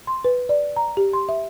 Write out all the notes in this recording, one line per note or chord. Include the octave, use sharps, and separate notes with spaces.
C6
B4
D5
A#5
G4
C6
E5